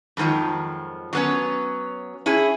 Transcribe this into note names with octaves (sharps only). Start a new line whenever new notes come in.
F2 G#2 D#3 F3 F#3
F#3 B3 C#4
C#4 E4 G#4